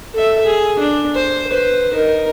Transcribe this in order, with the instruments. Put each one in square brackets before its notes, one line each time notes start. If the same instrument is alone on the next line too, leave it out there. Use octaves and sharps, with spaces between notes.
[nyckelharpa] A4 E5
G#4
D4
C5
B4 C5
D#4 A#4